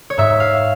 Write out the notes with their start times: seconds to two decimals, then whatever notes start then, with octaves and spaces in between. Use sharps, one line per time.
0.10 C#5
0.18 G#2 E5
0.40 F5